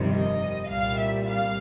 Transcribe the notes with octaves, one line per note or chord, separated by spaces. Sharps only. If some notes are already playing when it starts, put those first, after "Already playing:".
Already playing: G1 F2 C3 D#3 G3
D#5
C2 A#2 G3 F5
E5
F5